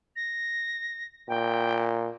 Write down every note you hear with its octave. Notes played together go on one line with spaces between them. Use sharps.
A#6
A#2 G5